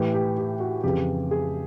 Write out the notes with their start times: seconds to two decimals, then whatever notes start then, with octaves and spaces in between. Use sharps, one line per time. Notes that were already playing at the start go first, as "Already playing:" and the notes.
Already playing: A2 E3 G4
0.14 G4
0.38 G4
0.60 F#4
0.83 F2 C#3 E3 G4
1.31 G#4